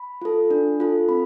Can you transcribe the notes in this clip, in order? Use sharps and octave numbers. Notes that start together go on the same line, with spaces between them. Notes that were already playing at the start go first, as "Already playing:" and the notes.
Already playing: B5
F4 A4
D4
F4 A4
C4 B5